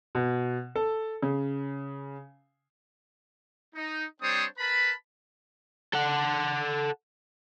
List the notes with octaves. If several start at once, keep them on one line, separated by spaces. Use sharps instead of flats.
B2
A4
C#3
D#4
G3 C4 D4 C5 C#5 D#6
A#4 B4 A5 B5
A4 F#5